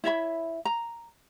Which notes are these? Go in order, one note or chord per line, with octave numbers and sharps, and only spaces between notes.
E4 C#5 E5 B5
A#5